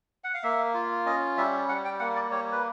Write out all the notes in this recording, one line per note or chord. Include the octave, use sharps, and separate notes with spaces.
F#5
F5
A#3 E5
F4
C#4 D#5
G3 E5
G3 F#5
G5
A#3 F#5
D5
G3 C#5
B4